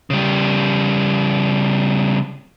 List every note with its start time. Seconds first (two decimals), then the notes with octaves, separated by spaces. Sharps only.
0.10 C#3 G3